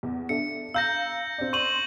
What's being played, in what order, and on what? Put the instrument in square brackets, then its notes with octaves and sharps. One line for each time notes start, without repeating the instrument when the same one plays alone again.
[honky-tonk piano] E2
[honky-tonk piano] D4 A4 E5 [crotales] C#7
[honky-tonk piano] F5 A#5 [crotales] E6 G6 A#6
[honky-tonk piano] C4 D5
[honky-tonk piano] C6 [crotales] C#6 D#7 F#7